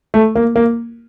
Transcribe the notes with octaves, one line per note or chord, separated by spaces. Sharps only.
A3
A#3
A#3